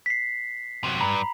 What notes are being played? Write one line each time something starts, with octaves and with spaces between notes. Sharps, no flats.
B6 C7
C3 F#3
G2 A#5 B5